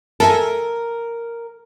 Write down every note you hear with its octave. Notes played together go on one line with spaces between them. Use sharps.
A4 A#4 E5 G#5 A5